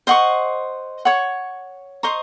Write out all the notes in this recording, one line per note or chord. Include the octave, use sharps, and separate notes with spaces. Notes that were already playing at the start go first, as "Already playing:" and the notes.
C5 D#5 F#5 C#6
C#5 F#5 C#6
C5 D#5 A#5 C#6